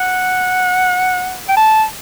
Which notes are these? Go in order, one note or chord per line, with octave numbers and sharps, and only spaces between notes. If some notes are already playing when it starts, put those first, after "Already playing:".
Already playing: F#5
G5
A5